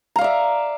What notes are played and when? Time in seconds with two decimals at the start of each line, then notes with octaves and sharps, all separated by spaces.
0.16 A#5
0.18 F5
0.21 D5
0.24 E5